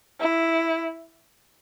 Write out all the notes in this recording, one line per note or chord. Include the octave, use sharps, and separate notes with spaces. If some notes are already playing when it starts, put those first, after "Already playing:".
E4